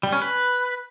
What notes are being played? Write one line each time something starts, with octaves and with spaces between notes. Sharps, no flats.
G3
C#4
B4